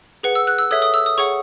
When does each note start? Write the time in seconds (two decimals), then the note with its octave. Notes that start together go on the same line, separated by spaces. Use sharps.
0.23 G#4 B4 F#5
0.35 E6
0.47 F#6
0.59 E6
0.71 A4 C#5 E5 D#6
0.82 D#6
0.94 E6
1.06 D#6
1.18 G#4 C#5 F#5 C#6